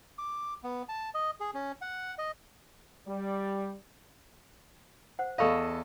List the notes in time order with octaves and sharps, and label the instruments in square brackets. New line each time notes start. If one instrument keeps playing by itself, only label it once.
[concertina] D6
B3
A5
D#5
G#4
C#4
F#5
D#5
[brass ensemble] G3
[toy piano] C5 F#5
[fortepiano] E2 A4 D#5 [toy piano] F5 B5 C#6